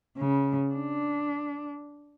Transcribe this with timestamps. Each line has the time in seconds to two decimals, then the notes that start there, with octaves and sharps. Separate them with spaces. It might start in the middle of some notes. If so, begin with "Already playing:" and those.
0.17 C#3
0.73 D4